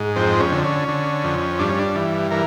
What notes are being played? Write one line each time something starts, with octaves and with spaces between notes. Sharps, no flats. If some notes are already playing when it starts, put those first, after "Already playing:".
Already playing: G#2
F2 C4
C#4
D3
C#4
D3
F2
G2 D4
C#4
D4
E3
E3 A#4